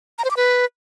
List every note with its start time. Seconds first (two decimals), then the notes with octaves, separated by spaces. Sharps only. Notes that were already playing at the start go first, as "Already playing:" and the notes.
0.19 A#5
0.25 C5
0.31 D6
0.37 B4